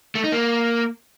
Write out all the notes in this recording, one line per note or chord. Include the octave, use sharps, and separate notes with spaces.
A3
D#4
A#3